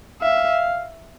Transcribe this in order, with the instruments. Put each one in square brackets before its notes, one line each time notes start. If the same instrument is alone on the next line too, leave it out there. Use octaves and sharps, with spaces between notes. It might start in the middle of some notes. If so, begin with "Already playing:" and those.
[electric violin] E5 [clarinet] F5